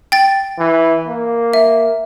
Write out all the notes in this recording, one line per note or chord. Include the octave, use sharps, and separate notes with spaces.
G5 A6
E3
A#3
E5